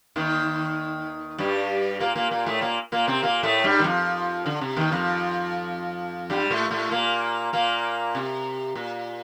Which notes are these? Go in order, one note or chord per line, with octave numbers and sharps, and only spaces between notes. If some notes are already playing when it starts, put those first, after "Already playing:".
D#2 D#3
G2 G3
A#2 A#3
A#2 A#3
A#2 A#3
A2 A3
A#2 A#3
A#2 A#3
C3 C4
A#2 A#3
A2 A3
G2 G3
D#3
F2 F3
D3
C3
D#2 D#3
F2 F3
G2 G3
A2 A3
A2 A3
A#2 A#3
A#2 A#3
C3
A#2